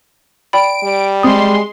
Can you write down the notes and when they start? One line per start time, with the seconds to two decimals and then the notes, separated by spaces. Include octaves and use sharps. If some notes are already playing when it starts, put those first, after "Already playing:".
0.53 D5 G5 B5 D7
0.84 G3
1.23 G#3 C4 C6 D#6